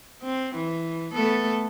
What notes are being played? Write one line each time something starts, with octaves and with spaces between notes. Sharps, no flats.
C4
E3
A3 B3 A4